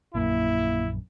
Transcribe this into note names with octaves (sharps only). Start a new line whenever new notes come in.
A#1 F#2 A#3 E4